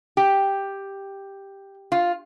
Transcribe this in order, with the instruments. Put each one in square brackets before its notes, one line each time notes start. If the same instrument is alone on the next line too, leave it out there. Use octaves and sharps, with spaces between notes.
[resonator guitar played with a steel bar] G4
F4